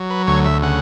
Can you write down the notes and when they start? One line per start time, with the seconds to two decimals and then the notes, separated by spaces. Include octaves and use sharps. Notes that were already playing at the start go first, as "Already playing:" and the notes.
Already playing: F#3
0.10 B4
0.27 D2 C#5
0.45 E5
0.63 C#3 F#5